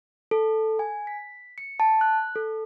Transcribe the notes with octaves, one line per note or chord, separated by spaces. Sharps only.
A4
G#5
B6
C#7
A5
F#6
A4